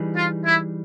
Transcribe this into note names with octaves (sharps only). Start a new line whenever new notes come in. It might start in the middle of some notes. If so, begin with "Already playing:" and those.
Already playing: E3 G3 D#4 G#4
F4
E4